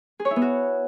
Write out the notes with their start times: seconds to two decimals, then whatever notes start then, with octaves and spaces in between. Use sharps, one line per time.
0.20 G#4
0.25 C#5
0.31 E4
0.36 B3
0.42 F#4